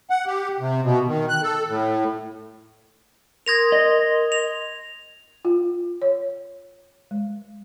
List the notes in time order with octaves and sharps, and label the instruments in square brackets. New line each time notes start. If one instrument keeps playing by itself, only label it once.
[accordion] F#5
G4
C3
B2
D#3
F#6
A4
A2
[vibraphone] A#4 C6 D#6 [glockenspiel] G#6 A#6 F7
[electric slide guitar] D#5
[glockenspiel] F7
[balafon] F4
C#5
G#3